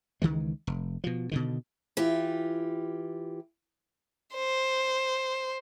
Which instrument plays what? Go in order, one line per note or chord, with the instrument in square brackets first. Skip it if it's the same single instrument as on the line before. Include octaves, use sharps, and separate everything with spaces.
[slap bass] C#2 D#3 E3 G#3
F1
B2 F3
B2 D3 D#3
[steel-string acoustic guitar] E3 F4 G4
[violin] C5